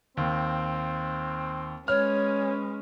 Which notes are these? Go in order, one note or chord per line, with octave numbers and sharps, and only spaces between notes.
D#2 C4
G#3 C#4 B4 C#5 F6